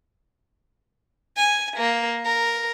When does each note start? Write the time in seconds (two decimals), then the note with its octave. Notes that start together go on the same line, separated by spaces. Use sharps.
1.36 G#5
1.76 A#3
2.24 A#4